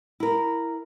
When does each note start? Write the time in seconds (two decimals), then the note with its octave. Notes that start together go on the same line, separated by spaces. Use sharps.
0.20 E4 A#4